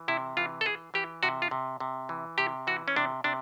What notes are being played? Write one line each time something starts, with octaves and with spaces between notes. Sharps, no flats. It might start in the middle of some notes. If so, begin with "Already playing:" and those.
Already playing: E3
C3 E4
E3 F4
A4
E3 G#4
E3 G4
C3 F#4
F4
C3
C3
E3
C3 G4
E3 F#4
C#4
C3 D4
C3 D4